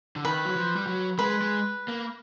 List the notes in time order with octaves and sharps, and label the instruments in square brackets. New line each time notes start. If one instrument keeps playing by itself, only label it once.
[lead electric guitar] D3
[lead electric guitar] D#3 [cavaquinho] B4
[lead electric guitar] F#3
F3
G3
F#3
[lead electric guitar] G#3 [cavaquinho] B4
[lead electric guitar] G#3
A#3